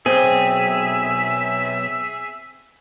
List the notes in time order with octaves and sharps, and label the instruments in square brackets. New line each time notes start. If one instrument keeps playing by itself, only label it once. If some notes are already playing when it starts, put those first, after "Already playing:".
[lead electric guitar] B1 [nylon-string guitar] C4 [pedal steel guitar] G#4 [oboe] E5